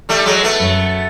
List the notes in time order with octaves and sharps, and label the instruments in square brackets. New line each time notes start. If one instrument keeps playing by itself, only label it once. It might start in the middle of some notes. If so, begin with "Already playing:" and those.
[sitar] G3 A3
F#3 G#3
A3 B3
[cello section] F#2 F#3